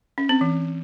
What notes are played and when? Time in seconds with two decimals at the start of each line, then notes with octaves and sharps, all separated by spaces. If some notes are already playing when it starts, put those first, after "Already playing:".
0.18 C#4
0.29 C4
0.41 E3